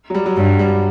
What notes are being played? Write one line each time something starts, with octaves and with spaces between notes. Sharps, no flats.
F#3
G3
F#3
G2 F#3
G3